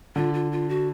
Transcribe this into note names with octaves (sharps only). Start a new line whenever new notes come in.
D3 F4
F4
F4
F#4